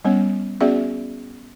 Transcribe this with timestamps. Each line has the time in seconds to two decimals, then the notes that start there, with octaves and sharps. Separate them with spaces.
0.05 G3 B3 C#4 C#5
0.61 B3 C#4 F#4 G#4 D5 E5